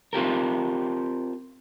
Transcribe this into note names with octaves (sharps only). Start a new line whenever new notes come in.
C4 F4 G4 A#4